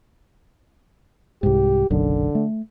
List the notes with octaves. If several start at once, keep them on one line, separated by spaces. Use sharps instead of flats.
C2 G#2 G4
F#1 B1 F#2 D3
A3